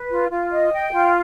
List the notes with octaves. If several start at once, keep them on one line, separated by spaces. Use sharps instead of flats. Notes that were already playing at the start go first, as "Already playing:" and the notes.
Already playing: B4
F4
F4
D#5
G5
F4